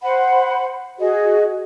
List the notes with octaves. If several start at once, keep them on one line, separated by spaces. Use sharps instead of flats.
C5 F#5 B5
F#4 G#4 D#5